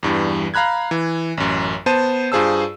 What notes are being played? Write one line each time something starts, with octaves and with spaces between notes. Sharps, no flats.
E2 G2 E3 G3
F5 A#5 B5 F#6 G#6
E3
A1 F#2
B3 C5 A5 D#7
G2 F4 G#4 C5 A5 E6